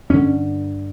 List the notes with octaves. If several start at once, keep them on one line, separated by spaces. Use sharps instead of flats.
G2 D3 C#4